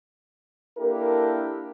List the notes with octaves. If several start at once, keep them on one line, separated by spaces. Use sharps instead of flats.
A#3 D4 E4 G4 A4 A#4